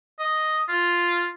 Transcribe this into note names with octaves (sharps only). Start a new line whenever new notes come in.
D#5
F4